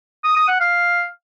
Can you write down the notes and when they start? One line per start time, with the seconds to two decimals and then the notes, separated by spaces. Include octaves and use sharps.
0.24 D#6
0.36 D#6
0.48 F#5
0.60 F5